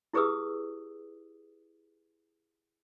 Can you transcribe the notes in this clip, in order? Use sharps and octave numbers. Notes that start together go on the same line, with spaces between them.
E4 G4 G#4 B4 D#6 E6